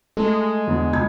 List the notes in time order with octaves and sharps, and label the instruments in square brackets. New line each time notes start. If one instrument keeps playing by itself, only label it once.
[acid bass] G#3 [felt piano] A3
[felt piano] E2 D3
C#2 G#6